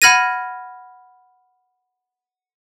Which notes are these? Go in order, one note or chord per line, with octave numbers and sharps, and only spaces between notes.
F#5 B5 F6 G#6 A#6 D#7